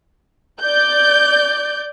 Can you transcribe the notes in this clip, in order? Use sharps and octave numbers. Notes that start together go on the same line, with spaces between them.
D5 G6